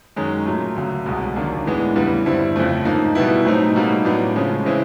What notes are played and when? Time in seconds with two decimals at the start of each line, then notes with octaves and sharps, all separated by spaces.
0.16 F#2 D#3 G#3 C#4
0.46 A#2 F#3 A3
0.76 D2 C#3 F#3
1.06 C2 B2 G#3
1.36 D#2 D3 F#3 A#3 D4
1.66 A2 E3 G#3 B3 D4
1.96 E2 C#3 E3 G3 B3
2.26 G2 D3 G3 C4 E4
2.56 F2 C#3 F3 A3
2.85 G#2 F3 A#3 D#4
3.15 B2 G3 B3 E4
3.45 A2 F#3 A3 C4 D#4
3.75 B2 G3 A#3 D#4
4.05 A2 F#3 B3 D4
4.36 C#3 F3 G#3 C#4
4.65 C#3 E3 G#3 C4 E4